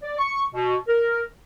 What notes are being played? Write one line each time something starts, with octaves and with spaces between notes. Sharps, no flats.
D5
C#6
B2
A#4